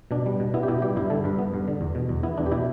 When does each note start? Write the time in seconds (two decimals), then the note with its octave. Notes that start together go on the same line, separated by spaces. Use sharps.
0.11 B2 D4
0.26 G3
0.40 B2
0.54 B3 E4
0.63 G4
0.68 B2 E4
0.82 G3 G4
0.96 G2 E4
1.10 D3 A4
1.24 G2 B4
1.39 B3
1.54 G2
1.68 D3
1.81 E2
1.95 B2
2.09 E2
2.23 B3 E4
2.37 E2 D4
2.46 G4
2.52 B2 E4